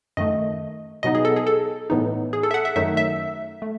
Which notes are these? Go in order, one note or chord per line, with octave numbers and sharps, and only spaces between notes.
F#2 D#3 A3 D#5
B2 F#3 B3 D#4 D#5
G#4
A4
G#4
A4
A2 E3 B3 D#4
G#4
A4
E5
F#5
E5
F#2 D#3 F#3 A3 D#4 E5
E5
A3